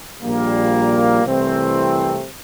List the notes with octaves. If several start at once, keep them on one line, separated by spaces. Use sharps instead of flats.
A#1 A#2 G3 A#3
C2 C3 E3 A3 C4